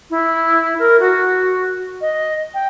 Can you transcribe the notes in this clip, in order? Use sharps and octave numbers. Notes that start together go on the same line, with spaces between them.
E4
A#4
F#4
D#5
G5